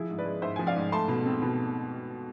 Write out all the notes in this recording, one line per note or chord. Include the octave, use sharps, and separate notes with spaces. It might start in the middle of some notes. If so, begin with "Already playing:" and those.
Already playing: F3 E4 G#4
G#2
B4 D5
G#3
G#2 C5 E5
F3 G#5
D5 F5
G#2
A3 A5 C6
B2
C4
B2